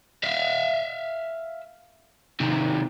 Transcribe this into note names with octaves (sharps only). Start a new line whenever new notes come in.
E5 F5
C3 D#3